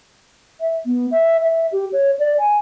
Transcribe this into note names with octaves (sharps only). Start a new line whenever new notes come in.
E5
B3
E5
E5
G4
C#5
D5
G#5